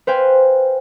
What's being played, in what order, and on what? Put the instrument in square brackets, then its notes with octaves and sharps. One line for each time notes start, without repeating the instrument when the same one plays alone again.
[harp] B4 C5 F5 G5 G#5